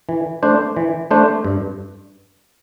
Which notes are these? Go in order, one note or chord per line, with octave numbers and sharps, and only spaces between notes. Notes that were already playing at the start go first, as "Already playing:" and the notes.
E3
A3 D4 C5
E3
A3 D4 C5
G2